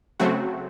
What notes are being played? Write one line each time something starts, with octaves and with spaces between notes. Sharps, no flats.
C#3 F#3 A3 C4 F#4